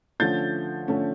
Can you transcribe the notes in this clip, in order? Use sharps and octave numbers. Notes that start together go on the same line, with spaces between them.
D3 F3 A3 C#4 G6 A6
D3 F3 A3 C#4